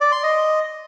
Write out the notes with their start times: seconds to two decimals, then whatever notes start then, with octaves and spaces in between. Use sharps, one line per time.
0.01 D5
0.12 C6
0.23 D#5